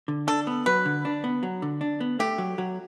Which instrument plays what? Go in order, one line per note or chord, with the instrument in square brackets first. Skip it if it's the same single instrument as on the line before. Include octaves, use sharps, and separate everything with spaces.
[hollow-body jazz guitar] D3
[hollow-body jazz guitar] D4 [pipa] A4
[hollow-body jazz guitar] B3
[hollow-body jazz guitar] F#3 [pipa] B4
[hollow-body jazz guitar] D3
D4
B3
F#3
D3
D4
B3
[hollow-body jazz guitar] A3 [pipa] G4
[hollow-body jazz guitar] F#3
F#3